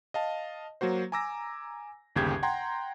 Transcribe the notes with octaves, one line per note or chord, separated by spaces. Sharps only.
D#5 F5 A5
F#3 A#3 F#4 C5
G#5 A#5 D6 E6 A#6
G1 D#2 C#3 G4 G6 G#6
F#5 G5 A#5 C6 G#6